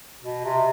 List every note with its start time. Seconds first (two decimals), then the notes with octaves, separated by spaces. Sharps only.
0.22 B2
0.45 C3